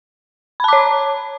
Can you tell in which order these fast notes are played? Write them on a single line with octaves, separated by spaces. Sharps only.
B5 A5 D6 C#5